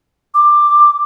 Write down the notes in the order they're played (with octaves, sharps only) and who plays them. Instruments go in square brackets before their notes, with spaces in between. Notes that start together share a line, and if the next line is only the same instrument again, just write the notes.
[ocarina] D6